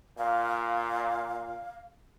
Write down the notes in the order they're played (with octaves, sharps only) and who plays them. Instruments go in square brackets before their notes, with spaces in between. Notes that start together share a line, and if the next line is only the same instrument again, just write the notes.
[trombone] A#2 [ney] F5